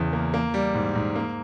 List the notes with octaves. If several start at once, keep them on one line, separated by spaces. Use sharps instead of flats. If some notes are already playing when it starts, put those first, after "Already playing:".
Already playing: E2 C#3 E3
A#3
A#3
G3
G#2
G#2
A#3